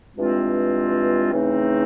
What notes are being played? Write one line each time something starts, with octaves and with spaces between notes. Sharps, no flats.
G2 E3 G#3 C4 F4
C#3 E3 A3 C4 D#4